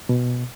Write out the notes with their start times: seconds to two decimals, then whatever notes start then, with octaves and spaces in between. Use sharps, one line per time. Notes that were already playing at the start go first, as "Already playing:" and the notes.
0.09 B2